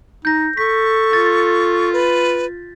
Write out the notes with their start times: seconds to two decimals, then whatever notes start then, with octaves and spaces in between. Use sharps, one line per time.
0.25 D#4 G6 A#6
0.57 A4 C#6 B6
1.13 F4 A6
1.93 B4